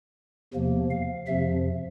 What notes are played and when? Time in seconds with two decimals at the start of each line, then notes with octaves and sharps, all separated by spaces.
0.54 E2 C3 F3 A#3
0.90 F5
1.27 F2 C3 F3 E5